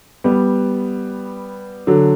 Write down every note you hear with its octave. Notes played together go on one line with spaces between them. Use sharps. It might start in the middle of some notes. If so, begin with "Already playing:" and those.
G3 B3
D3 F#3